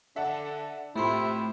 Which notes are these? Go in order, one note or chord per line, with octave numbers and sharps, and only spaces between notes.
D3 E5 F#5 A5
A2 C3 A3 E4 F4 C6